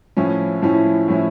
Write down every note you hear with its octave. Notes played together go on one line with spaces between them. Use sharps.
A2 F3 C#4 E4
A2 F3 C#4 E4
A2 F3 C#4 E4